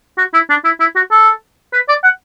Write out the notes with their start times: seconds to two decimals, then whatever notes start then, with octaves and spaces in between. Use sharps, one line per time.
0.18 F#4
0.34 E4
0.50 D4
0.65 E4
0.80 E4
0.96 F#4
1.11 A4
1.73 B4
1.89 D5
2.04 F#5